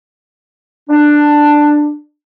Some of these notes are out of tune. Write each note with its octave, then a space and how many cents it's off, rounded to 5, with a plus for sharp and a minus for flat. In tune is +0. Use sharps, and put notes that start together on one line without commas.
D4 +10